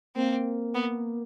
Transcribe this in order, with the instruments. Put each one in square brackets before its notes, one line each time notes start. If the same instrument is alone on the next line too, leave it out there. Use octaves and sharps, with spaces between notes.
[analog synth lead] A#3 [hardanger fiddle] C4
[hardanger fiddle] B3